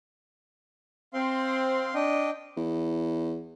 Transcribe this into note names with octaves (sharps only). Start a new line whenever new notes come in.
C4 F5 C6
D4 D#5 G5
E2